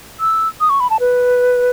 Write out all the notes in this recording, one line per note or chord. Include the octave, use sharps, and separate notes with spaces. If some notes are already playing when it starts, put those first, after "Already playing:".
E6
D#6
C#6
B5
A5
B4